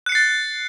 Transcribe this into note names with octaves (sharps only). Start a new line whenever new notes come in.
F#6 A6 C7 C#7